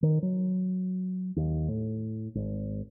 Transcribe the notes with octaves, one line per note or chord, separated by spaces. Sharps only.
D#3
F#3
D#2
A2
G#1